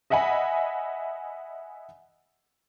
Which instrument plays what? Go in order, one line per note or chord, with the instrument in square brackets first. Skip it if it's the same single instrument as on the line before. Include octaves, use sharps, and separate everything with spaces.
[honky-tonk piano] D#5 E5 F#5 G#5 B5